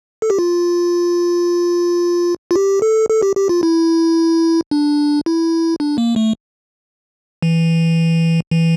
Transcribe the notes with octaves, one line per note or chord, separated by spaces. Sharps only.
A4
G4
F4
F4
G4
A4
A4
G4
G4
F4
E4
D4
E4
D4
A#3
A3
E3
E3